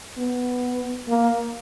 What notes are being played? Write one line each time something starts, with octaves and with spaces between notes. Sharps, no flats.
B3
A#3